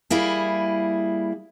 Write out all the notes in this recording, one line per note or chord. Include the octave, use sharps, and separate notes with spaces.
G3 A#3 E4 G#4